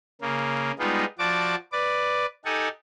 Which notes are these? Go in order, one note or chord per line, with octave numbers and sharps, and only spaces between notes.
C#3 A#3
G3 G#3 B3 D#4 F4
F3 F#4 D5 A5 D6
B4 D5 D6
D#4 G4 A4 F#5 G#5